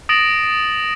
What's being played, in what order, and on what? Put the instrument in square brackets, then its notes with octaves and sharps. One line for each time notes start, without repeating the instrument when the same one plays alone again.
[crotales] D#6 A6 A#6 D7 E7 F#7